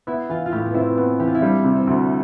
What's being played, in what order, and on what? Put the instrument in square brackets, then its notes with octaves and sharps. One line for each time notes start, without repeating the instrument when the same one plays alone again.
[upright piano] B3 [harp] E4
[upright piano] E3 [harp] F4
[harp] F4
[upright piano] A2 [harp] G4
[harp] B3
[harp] C4 [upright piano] E4
[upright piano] B3
[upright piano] E3 [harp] G4
[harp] F4
E4
[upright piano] G3 [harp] D4
[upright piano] C3
[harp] C4
[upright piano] D2